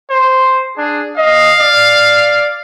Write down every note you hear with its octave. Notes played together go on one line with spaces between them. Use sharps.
C5
D4 G#4
D#5 F5
D5